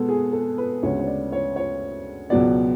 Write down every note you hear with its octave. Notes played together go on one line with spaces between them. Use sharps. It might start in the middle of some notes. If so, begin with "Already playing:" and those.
Already playing: B2 G#3 B3 A4
G#4
A4
B4
D2 C#3 G#3 B3 C#5
C#5
D5
C#5
C#5
C#2 B2 F#3 B3 D5